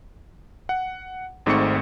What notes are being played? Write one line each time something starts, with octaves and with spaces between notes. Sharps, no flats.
F#5
G#1 G#2 A3 C4 C#6 C#7